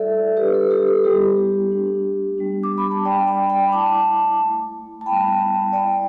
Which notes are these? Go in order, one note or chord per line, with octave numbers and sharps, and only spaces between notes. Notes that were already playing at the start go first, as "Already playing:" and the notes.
Already playing: G3 E4 A4 D5 E5
G3 D4 G4 B4
A4
G4
A4
G3 B3 E4 G4
A3 D4
G3 B3 D4
D6
B5
A5
G3 D4 D5 G5
G5 B5
G5 B5
A3 E4 A5 D6
A3 E4
A5
G3 B3 E4 G5 B5
A3 E4 D5 G5